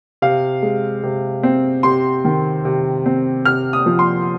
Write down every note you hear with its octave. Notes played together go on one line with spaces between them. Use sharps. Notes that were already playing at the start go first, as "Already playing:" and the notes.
C3 F5
G#3
C3
C4
C3 C6
D#3
C3
C4
C3 F6
D#6
F3
C6